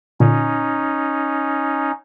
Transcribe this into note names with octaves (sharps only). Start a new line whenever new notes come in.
A#2 D3 C#4 D#4